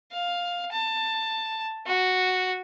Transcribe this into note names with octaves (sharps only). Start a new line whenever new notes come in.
F5
A5
F#4